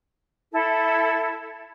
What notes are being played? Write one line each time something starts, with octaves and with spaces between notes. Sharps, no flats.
E4 A4